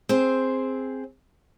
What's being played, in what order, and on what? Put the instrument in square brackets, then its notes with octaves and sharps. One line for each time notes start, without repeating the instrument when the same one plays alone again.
[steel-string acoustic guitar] C4 G#4 C5